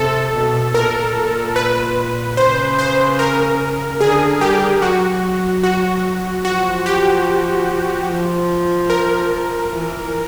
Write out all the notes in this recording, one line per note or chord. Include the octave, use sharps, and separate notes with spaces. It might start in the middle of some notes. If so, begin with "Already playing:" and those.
Already playing: C3 A4
B2
A#2 A#4
A#2
B4
C#3 C5
C5
A#4
D3 G#4
G3 G4
F#3 F#4
F#4
F3 F#4
G4
F3
A#4
E3